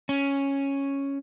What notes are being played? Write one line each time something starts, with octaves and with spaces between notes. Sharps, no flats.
C#4